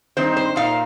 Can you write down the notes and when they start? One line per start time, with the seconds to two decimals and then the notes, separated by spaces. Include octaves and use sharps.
0.17 G2 D#3 C4 D#4 C5
0.37 C5
0.56 A#2 A#3 D#4 F5